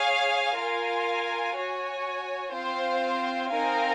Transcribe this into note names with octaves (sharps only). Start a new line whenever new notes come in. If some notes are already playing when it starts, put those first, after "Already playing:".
Already playing: G#4 C#5 F5 G#5
F4 A#4 F5 G#5
F#4 C#5 G#5
C4 F4 C5 F5
C4 D#4 A#4 F5 G#5